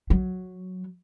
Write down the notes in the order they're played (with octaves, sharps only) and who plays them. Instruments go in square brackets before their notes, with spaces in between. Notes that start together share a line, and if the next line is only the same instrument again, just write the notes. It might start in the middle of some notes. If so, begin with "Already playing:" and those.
[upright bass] F#3